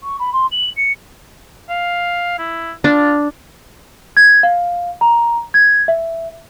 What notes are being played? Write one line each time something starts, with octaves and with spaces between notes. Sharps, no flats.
C#6
B5
C6
F#7
C#7
F5
E4
D4 F4
G#6
F5
A#5
G#6
E5